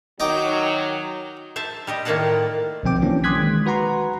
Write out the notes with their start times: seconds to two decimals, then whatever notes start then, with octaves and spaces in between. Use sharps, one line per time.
0.20 D#3 F#3 D#4 G5 D6
1.56 C5 E5 A5
1.87 G3 G4 D#5
2.05 A2 D#3 A#3 F4 F#5 A5
2.83 B1 D3 F3 C4 G5 D6
3.02 D3 E3 F#3 A#3 C#4 D4
3.24 C6 D6 D#6 F#6 G#6 B6
3.37 D#3 G#3
3.66 F#4 B4 F#5 A#5 C6